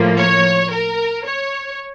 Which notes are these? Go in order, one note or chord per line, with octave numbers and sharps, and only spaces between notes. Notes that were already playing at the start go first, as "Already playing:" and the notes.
Already playing: A2 F3 A#3
C#5
A#4
C#5